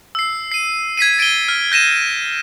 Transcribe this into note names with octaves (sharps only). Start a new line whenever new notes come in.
E6 C7
C7 D#7
G#6 B6 C7 D#7
A6 D7 D#7 G7
F6
G6 A#6 D#7 E7